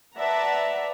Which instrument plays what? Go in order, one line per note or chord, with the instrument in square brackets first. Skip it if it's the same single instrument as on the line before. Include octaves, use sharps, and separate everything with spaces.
[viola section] B4 D5 E5 F#5 A5 A#5